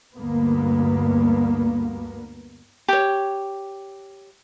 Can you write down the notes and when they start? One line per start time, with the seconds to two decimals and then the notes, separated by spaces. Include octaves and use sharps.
0.16 D2 G2 A#3 B3
2.88 G4 C#5